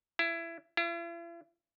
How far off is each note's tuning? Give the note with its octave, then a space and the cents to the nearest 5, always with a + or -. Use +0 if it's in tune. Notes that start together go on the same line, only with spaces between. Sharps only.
E4 +20
E4 +45